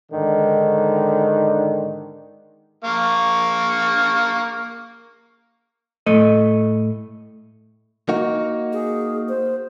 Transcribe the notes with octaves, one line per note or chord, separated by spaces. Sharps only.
G#2 D3 D#3
A#3 F5 C#6
A2 A3 D#5
A#3 D#4 F#4
G#4
C5